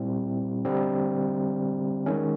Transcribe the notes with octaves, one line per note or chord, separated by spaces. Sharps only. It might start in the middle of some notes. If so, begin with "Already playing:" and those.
Already playing: A#2 G3 C4 E4
D3 G3 C4
D#3 G#3 C#4